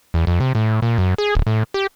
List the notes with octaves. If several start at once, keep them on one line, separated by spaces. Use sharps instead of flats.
E2
F2
C3
A2
A#2
F#2
G#4
D1
A2
G4